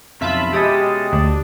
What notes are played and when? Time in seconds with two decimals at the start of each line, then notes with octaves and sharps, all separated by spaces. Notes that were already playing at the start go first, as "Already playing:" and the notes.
0.21 B1 F2 C#3 F4 E5 A5 B5
0.52 B2 G#3 C#4 G4 A4 D#6
1.13 D2 D4